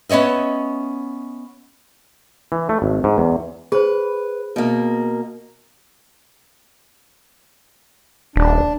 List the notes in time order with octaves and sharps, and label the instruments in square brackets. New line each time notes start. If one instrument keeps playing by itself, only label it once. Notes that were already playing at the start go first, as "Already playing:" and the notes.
[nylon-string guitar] B3 C#4 C#5 D#5 E5
[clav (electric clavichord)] E3
A3
G#1
G#2
E2
[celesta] G#4 C5 [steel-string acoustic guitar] B4
[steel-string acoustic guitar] B2 A#3
[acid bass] D#1 [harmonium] D4